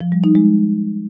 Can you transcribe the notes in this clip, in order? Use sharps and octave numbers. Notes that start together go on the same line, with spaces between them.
F3
G3
D#4
G#3